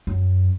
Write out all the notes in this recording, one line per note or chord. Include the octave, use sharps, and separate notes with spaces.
F#2